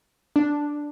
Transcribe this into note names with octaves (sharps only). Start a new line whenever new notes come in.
D4